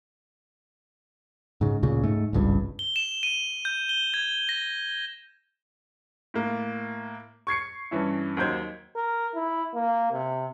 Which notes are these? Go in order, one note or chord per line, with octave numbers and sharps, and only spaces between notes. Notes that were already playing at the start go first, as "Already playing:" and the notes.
G#2 C#3
D2 A#2 C#3
G#2 A3
G#1 C#2 G2
G7
E7
D#7
G6
G7
G#6
A#6
A2 A#3
C#6 G#6 C7 C#7
G2 E3 C#4 E4
D#2 F#3 D#4 C5 G6 G#6
A#4
E4
A#3
C3